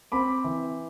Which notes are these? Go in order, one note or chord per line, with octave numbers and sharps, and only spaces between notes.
C4 B5 D6
E3